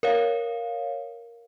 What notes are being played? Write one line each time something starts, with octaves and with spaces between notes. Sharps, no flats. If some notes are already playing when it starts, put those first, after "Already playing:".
A#4 C#5 F5